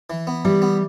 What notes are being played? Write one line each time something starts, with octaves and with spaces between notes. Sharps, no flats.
E3
B3
E3 G3
B3